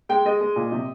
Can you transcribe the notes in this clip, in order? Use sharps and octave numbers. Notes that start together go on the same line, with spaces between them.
G#3 G5
G#3 D#5
G#3
A#2
C3